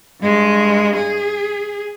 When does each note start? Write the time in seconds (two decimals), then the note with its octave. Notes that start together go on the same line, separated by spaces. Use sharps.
0.22 G2 G#3
0.96 G#4